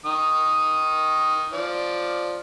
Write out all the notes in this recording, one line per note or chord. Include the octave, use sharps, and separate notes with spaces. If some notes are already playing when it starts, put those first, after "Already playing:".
D#3 D#6
F3 D5